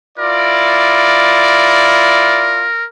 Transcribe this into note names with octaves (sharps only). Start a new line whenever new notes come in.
E4 F4 A#4 D5